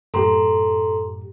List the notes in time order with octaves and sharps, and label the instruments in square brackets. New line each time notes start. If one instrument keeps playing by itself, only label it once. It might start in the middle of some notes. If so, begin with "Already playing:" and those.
[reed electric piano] F#2 A2 G4 [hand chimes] A4 A#5 C6